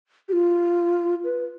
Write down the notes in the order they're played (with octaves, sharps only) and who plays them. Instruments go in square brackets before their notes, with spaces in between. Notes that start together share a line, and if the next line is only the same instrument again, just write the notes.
[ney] G4
F4
B4